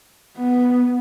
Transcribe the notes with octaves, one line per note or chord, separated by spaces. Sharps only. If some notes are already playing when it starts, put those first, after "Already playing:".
B3